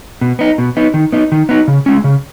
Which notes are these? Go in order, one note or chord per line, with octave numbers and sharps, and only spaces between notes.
B2
B3 D#4
B2
B3 D#4
D#3
B3 D#4
D#3
B3 D#4
C#3
G#3 C#4
C#3